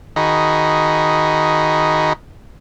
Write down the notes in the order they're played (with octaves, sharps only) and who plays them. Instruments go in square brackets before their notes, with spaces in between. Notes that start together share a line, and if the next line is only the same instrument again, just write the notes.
[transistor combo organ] D#3 D#4 F#4 G#4 B5